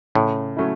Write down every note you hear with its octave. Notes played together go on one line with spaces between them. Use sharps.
A2 C#3
F#3 A3 C#4 E4